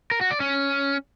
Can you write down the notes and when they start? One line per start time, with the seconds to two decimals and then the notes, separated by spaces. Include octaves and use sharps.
0.11 A#4
0.21 F#4
0.31 D5
0.40 C#4